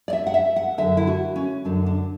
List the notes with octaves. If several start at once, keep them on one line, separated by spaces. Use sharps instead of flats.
D5
E5
F#5
E5
F#5
F#2 D3 E5
E4
F#4
C#4
F#2 D3 D4
D4